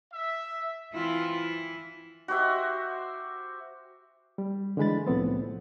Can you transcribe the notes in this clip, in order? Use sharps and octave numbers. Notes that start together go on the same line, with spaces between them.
E5
E3 C4 E4 F4
F#4 G4 C5 E5
G3
D3 E3 G#3 B5 A6
C2 A2 F3 B3 C4